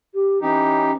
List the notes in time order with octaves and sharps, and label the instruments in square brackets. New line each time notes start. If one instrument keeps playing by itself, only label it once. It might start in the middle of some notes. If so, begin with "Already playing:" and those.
[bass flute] G4
[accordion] E3 D#4 G4 [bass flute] C#4